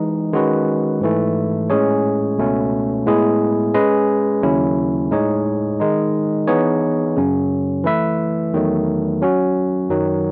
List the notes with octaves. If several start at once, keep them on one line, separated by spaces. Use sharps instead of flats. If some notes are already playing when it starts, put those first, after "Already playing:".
Already playing: E3 G#3 D#4
D#3 G#3 C#4 F#4 B4
G#2 E3 A3
A2 G#3 C#4 G#4 C#5
C#2 B2 A3 C#4
A2 G#3 B3 E4 G#4
G#3 C#4 G#4 B4 D#5
D#2 C#3 F#3 C#4 E4
A2 G#3 D#4 G#4 C#5
D#3 G#3 D#4
E3 B3 D#4 G#4 C#5
F#2 C#3 F#3 C#4
E3 A3 E4 B4 E5
E2 D#3 F#3 A3
F#3 C#4 F#4
F#2 D#3 F#3